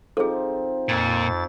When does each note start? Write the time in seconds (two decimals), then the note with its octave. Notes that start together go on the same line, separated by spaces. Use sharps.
0.17 F3 C4 D#4 G#4 A4
0.89 F2 A#2 A6